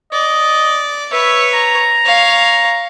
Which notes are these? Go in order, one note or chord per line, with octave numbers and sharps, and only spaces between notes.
D5 D#5
B4 C#5 E5
A#5
C#5 F5